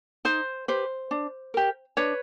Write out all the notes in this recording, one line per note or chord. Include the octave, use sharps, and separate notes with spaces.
D#4 C5
G4 B4 C5
D4
G4 A#4
D4 B4 C#5